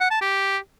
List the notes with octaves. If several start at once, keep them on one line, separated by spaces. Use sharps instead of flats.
F#5
A5
G4